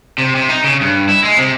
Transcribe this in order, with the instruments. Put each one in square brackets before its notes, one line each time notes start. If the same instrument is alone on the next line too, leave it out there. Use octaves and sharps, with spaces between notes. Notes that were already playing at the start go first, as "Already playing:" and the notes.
[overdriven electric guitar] C3
C3
D#4
C#3
G2
E4
G#3
C3